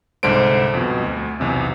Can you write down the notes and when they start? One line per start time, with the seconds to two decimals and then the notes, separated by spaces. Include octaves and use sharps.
0.23 C2 G#2 D3 D4 C5 D7
0.74 F2 B2
1.04 D2
1.40 B1 E2 C3